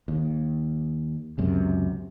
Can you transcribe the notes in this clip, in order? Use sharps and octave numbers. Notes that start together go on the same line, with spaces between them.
D#2
C#2 F#2 C3